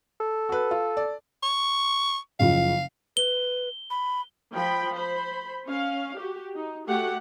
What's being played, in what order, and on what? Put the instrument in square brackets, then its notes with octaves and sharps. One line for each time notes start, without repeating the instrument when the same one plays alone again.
[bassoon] A4
[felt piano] F#4 B4
F4
D5
[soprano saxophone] C#6
[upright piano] F#1 C#3 F3 [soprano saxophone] F5
[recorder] B4 [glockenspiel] G7
[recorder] B5
[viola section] F3 G5 B5
C5 B5
C#4 F5
F#4 G4
D#4
A3 F#4 G4 F#5